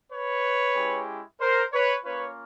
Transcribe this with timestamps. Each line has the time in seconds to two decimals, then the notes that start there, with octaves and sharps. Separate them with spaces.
0.12 B4 C#5
0.76 G#3 C#4 E4 G4
1.40 A#4 C5
1.73 B4 C#5
2.05 A#3 C#4 F4 B4 C#5